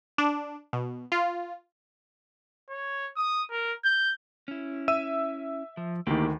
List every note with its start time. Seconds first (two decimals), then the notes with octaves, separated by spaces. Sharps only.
0.18 D4
0.73 B2
1.12 F4
2.70 C#5
3.16 D#6
3.51 A#4
3.84 G6
4.48 C#4 E4
4.88 E5 E6 D#7
5.77 F3
6.07 D2 D#3 A#3 E4 G4